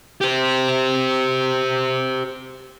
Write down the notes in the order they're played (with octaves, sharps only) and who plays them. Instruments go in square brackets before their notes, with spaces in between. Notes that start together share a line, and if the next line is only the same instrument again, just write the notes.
[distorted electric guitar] G4 C5